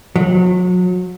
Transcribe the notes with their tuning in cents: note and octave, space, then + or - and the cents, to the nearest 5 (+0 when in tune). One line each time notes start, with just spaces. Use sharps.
F#3 -35